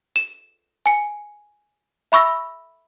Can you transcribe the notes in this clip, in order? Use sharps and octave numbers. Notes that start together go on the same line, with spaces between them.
E7
G#5 C#7
E5 B5 C#6 E6 A#6